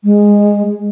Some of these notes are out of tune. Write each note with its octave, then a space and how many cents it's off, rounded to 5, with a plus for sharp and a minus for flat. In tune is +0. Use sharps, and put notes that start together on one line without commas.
G#3 -10